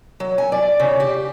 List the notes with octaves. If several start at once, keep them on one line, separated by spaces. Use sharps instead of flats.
F#3
G#5
D5
C#3
G4